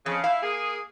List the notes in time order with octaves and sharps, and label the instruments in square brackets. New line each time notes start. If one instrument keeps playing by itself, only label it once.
[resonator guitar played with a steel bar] F2 [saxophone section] C#3
[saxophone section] E4 [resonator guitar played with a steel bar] F5
[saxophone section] A#3 G#4